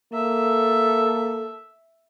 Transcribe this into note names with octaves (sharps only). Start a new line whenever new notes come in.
A#3 A4 E5